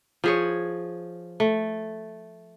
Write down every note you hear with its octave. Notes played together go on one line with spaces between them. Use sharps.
F3 G#4 C#5
A3